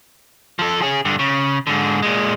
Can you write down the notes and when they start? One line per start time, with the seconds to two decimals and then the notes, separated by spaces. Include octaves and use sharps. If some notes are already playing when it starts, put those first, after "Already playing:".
0.59 F3 A4
0.82 C#4 G#4
1.05 G2 D3
1.19 C#3
1.67 G#2 D3
2.02 A#2 G#3